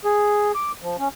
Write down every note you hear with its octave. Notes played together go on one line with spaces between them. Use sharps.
G#4
D6
F3
C#4